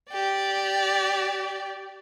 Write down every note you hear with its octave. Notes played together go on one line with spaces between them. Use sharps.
G4 D5